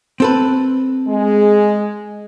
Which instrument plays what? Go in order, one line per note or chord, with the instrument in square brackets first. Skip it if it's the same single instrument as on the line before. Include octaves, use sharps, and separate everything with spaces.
[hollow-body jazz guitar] C4 A4 B4
[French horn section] G#3 G#4